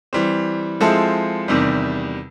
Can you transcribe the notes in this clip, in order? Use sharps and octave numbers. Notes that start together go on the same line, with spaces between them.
E3 G3 C4
F3 G#3 C4 E4 A4
E2 C3 D#3 G3